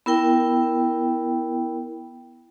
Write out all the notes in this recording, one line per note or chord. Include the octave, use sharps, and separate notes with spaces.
B3 E4 A#4 G5